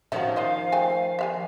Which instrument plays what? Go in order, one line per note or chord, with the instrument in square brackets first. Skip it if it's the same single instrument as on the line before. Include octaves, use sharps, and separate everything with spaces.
[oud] D#3 F3 C#4 [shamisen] F#4 E5
[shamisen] F4 C5 D#5 [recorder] F5
[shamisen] A3 G5 G#5
E5 F5 G#5